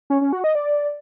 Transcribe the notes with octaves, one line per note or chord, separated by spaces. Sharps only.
C#4
C#4
F#4
D#5
D5